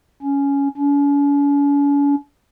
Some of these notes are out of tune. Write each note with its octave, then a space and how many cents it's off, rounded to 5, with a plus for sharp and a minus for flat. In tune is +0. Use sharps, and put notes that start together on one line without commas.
C#4 +10
C#4 +45